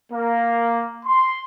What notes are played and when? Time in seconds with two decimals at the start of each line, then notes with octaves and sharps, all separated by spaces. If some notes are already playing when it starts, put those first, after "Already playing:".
0.13 A#3
1.06 C6